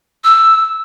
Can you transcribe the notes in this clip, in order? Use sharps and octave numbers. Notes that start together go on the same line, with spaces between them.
E6